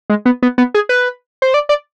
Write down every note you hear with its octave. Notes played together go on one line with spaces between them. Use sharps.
G#3
B3
B3
B3
G#4
B4
C5
D5
D5